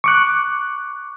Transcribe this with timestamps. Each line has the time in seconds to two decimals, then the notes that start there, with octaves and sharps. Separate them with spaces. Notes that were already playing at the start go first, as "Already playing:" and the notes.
0.04 C#6 D6 F#6